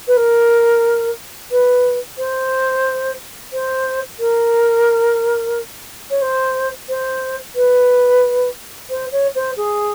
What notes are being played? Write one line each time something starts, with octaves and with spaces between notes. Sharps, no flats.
B4
A#4
B4
C5
C5
A#4
C#5
C5
C5
B4
C5
C#5
C5
G#4